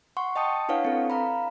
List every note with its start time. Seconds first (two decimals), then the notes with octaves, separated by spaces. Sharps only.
0.17 F#5 C6 C#6
0.36 D#5 G5 A5 D#6 C#7
0.69 D4 E4 B4 C#5 F5 F#5
0.85 C4 A4
1.10 F5 A#5 B5